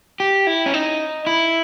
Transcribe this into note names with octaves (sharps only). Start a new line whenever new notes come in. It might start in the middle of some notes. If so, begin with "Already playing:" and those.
G4
E4
C#4
D#4
E4